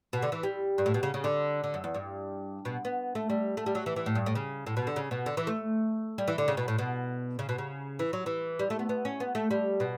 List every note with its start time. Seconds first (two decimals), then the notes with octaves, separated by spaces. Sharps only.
0.13 B2
0.22 D3
0.32 E3
0.43 G3
0.78 G2
0.86 A2
0.94 B2
1.03 C#3
1.14 C#3
1.24 D3
1.64 D3
1.74 F#2
1.84 E2
1.94 G2
2.65 B2
2.85 B3
3.15 A3
3.30 G3
3.57 A3
3.66 G3
3.75 F#3
3.86 E3
3.96 E3
4.06 A2
4.15 G2
4.26 A2
4.35 C#3
4.67 A2
4.77 B2
4.87 D3
4.96 C#3
5.11 B2
5.26 D3
5.37 E3
5.47 A3
6.18 G3
6.28 E3
6.38 D3
6.48 C#3
6.57 B2
6.68 A2
6.79 B2
7.39 C#3
7.49 B2
7.58 C#3
7.99 E3
8.13 F#3
8.26 E3
8.59 G3
8.70 A3
8.79 B3
8.89 B3
9.05 C#4
9.20 B3
9.35 A3
9.51 G3
9.80 B2